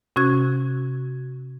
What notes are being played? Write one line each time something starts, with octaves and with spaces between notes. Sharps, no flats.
C3 C#4 F#4 G#6